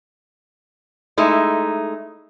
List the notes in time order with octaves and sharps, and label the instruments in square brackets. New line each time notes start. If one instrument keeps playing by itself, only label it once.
[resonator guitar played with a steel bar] G#3 A3 D#4 E4